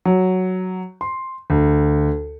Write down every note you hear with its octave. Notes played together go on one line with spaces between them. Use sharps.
F#3
C6
D2